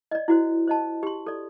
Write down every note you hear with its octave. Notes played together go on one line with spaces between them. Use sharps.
D5 D#5
E4 F#4 C5
C5 D#5 A5
G4 C6
A4 D5